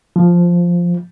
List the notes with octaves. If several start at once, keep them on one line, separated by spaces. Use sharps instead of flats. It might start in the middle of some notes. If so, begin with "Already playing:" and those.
F3